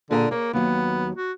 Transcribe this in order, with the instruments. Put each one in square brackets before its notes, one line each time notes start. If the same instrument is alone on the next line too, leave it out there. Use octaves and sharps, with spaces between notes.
[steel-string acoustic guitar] A#2 G#4 A#5 [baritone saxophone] D3
[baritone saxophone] A#3 [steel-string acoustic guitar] G#4 C#5
[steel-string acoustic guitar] D#2 F#3 [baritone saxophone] B3
[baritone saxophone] F#4